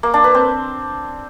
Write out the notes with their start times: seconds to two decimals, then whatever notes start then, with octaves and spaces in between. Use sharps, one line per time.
0.03 A#3
0.14 D4
0.24 B4
0.34 C4